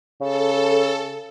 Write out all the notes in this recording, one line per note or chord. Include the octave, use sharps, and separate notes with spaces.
C#3 A4